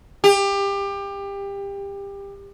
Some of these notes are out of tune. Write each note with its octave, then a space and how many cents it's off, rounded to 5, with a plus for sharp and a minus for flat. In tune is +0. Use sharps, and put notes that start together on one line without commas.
G4 +25